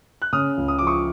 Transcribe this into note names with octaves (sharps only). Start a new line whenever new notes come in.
F#6
C#3 D#6 F6
C#2
D#6
F3 D6
C#6 D#6